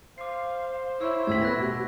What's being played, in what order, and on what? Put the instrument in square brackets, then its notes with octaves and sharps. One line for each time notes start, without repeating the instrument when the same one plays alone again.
[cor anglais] C5 [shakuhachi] F5 [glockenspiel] D6 C7
[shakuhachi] E4 [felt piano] C#5 [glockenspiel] C#6 E6
[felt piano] D#1 A2 B6 [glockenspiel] B5 E6 G#6
[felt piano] B3 [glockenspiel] F#6 A#6
[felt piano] B2 G4